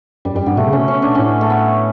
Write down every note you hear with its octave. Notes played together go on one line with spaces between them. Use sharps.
F#2 G3
F#2 G3
G2 B3
B2 A3
C#3
B2 C#4
C#4
D4
A2 C#4
A3
B3